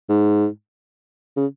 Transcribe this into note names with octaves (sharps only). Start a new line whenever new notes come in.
G#2
C#3